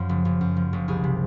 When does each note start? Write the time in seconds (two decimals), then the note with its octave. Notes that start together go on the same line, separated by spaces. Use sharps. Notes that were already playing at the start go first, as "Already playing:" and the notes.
Already playing: F#2 F3
0.09 F#1
0.25 F#1
0.41 F#2
0.56 F3
0.73 F#1
0.88 C2 G#4
1.04 C3